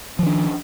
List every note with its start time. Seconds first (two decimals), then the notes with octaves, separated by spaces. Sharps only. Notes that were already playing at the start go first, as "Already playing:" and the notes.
0.19 F3
0.23 D#3
0.26 D4